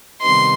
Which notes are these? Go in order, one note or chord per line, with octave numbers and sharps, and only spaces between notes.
C3 D#3 G3 B3 D#4 C6